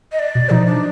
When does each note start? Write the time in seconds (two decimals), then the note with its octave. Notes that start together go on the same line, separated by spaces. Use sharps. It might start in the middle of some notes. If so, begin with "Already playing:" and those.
0.12 D#5
0.19 D5
0.35 B2
0.50 F3 D#4
0.66 D4